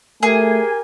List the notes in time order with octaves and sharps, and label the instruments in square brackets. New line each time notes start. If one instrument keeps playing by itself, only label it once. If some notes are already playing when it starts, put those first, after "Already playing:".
[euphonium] A3 [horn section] G4 G#5 [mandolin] G#4 [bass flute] A#4